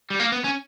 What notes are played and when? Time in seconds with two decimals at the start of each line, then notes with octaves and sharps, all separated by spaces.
0.10 G3
0.20 A#3
0.32 B3
0.44 C#4